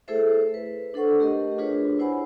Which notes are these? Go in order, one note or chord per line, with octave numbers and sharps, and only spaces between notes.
A3 E4 G#4 A4 C5 E5
B4
D4 A4 C5 F#5 C#6
A3 G4 A#4 D#5
D4 F4 G#4 B4 C#5
E4 C5 F#5 G#5 B5